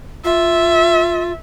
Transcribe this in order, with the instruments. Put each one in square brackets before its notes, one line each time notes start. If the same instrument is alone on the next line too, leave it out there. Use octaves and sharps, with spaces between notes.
[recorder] F4 [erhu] E5